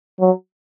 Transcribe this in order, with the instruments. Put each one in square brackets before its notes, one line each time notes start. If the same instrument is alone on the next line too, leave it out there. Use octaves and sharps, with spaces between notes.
[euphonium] F#3